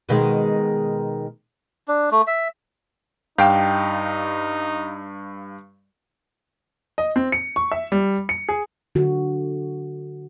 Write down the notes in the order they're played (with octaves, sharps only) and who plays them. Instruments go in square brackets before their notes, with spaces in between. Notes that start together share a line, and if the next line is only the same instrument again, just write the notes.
[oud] B2 D#3 G#3
[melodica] D4
A3
E5
[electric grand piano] G2 F5 G6 [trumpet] D#4 [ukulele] G4 G5 A5
[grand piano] D#5
C4
C#7
C#6
E5
G3
C#7
G#4
[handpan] D3 F#4